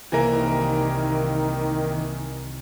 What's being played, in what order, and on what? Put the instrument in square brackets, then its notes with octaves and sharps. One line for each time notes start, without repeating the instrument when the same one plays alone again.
[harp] C2 [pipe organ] D#3 [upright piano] E3 A#3 A#4